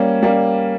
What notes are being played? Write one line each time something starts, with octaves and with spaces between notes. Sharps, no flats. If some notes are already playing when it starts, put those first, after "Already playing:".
Already playing: G3 A#3 C#4
G3 A#3 C#4